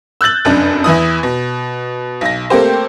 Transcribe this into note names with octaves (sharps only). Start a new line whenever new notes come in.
E6 F#6 G6 A6 F#7
F1 F#2 D4
E2 E3 E4 D#6
B2
B1 A#6
A3 A#3 C4 G4 C5